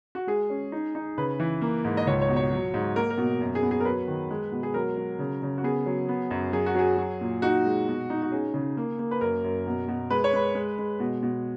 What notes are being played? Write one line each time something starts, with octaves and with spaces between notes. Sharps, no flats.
F#4
G#3 G#4
C#4
D#4
D#4
C#3 B4
E3
A#3
G#2
D#5
C#2 C#5
C#5
B2
C#5
F#3
G#2
A#3 A#4
A#4
B2
F#2
G#4
B3
G#4
A#4
F#3 B4
D#3
G#3
B2
G#4
F#3 A#4
F#3
C#3
C#3
F#4
B3 G#4
F#3
B3
F#2
F#3 G#4
F#4
F#3 G#4
F#3
A#2
D#4 F#4
G#3
B2
D#4
F#4
C#4 G#4
C#3
A#3
A#3
B4
F#2 A#4
F#2
B2
B2
G#3 B4
C#5
G#3 B4
G#3
G#3
B2
B2